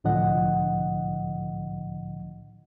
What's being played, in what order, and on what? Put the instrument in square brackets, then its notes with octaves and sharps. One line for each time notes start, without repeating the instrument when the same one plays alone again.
[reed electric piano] C2 A2 D3 F3 D#5 F#5